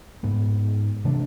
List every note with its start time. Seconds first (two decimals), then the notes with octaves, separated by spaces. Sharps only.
0.23 G#2 G#3 B3
1.04 C3 E3 A3 D4